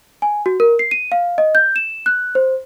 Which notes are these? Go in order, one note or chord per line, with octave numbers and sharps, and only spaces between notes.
G#5
F#4
A#4
C7
D#7
F5
D#5
G6
E7
F#6
C5